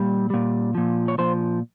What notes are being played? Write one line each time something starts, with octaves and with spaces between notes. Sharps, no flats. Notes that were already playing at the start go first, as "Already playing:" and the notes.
Already playing: A#2 G3
A#2 G3
A#2 F3
C#5
A#2 F3 C5